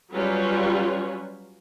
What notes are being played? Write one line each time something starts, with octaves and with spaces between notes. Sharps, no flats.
F#3 G3 C#4 F4 B4 C#5